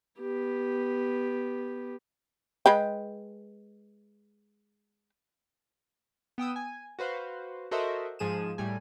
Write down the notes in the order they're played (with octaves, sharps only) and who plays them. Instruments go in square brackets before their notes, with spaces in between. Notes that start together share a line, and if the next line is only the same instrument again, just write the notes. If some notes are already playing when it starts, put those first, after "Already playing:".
[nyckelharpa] B3 G4
[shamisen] G#3 B4 G5
[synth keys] B3 G5 D#6 E6
G#5
F#4 B4 C5 F5
F#4 A4 A#4 C5 D#5 E5
G#2 F3 G#4 D#7 E7
A2 G3 G#5